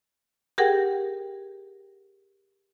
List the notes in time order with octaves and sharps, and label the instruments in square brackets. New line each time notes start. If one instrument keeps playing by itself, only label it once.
[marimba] G4 G#4 A#4 F#5 G5